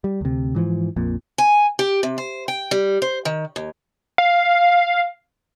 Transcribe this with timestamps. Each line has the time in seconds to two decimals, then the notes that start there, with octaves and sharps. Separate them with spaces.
0.04 G3
0.21 D2 C3
0.55 G#2 E3 F3
0.96 A#1 F2 A#2
1.38 G#5
1.79 G4
2.03 C3
2.18 C5
2.48 G5
2.71 G3
3.02 C5
3.25 D#3
3.56 D#2
4.18 F5